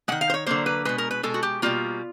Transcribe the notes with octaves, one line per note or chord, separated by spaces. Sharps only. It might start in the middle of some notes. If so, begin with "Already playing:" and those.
D#3 G#3 F#5
F5
C5
C#5
D3 F#3 A#3 C5
B4
B2 G#3 B4
A#4
B4
B2 G#3 A4
F#4
G4
B2 G3 A#3 F4